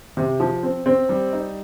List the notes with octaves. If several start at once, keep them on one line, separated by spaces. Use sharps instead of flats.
C3
F3
C4
C4
G3
D#4